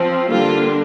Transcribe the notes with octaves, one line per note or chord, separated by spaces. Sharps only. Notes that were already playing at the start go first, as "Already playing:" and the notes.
Already playing: F3 C4
D3 G3 A#3 D4 F4